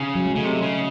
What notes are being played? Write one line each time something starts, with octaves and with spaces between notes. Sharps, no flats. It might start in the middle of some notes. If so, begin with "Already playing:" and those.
Already playing: C#3
F#3
G#3
C#3 A3
C3
C#3